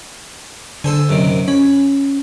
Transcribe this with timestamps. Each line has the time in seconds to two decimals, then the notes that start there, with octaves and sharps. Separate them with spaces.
0.84 D3 A4 C5 G#5
1.09 F#2 C3 D#3
1.48 C#4 B5